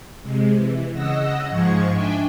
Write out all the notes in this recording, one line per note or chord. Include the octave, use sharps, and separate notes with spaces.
C3 G#3
E3
C#3 D#5 F#5 E6 A#6
G#2 F3 G#3 C#6 G#6
D4 E5 G5 G#5